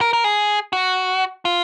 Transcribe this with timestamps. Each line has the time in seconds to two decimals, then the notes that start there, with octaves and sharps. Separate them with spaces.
0.01 A#4
0.13 A#4
0.24 G#4
0.73 F#4
1.45 F4